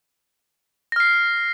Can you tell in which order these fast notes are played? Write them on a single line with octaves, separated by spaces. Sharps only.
A#6 F6 C7